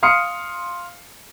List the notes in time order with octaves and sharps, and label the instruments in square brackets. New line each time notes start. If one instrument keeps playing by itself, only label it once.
[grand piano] F5 C6 D#6 F6 C7 C#7